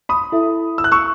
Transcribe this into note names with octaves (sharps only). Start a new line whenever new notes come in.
B5 D#6
E4 A4 E5
E6
F#6
C#6 E6